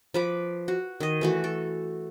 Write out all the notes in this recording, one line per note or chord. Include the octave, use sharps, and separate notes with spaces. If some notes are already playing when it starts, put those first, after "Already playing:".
F3 B4 D6
F#4
D#3 D#5
E3 A3 F#4
A4